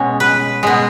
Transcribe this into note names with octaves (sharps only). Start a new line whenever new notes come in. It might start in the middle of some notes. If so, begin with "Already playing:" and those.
Already playing: B2 G#3 C#4
B4
B2 G#3